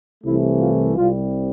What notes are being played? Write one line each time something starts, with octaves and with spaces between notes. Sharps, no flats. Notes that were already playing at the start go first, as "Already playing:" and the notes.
C2 C3 E3 A3 E4
F4
C2 C3 G3 F4